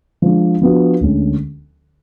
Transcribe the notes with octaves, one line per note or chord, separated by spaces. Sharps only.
F3 G#3 D4
F3 B3 D4 F#4
D2 D3 G#3 C#4